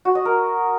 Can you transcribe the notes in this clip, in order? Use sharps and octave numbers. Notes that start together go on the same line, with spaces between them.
F#4
D#5
A#4